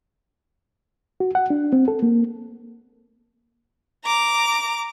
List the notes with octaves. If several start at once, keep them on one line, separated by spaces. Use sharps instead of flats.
F#4
F#5
D4
C4
A4
A#3
A#5 D6